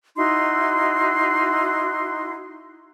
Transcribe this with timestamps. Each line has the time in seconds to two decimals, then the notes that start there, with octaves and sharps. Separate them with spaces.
0.17 D#4 E4 F#4 C6